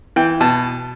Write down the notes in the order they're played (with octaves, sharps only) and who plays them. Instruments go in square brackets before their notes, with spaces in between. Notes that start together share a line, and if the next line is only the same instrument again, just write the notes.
[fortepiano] E3 G5
B2 A5